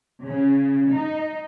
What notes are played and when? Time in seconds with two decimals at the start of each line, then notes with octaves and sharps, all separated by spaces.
0.25 C#3
0.92 D#4